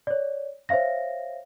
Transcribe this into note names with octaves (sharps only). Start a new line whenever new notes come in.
C#5 D5
C5 C#5 E5 F5 A#6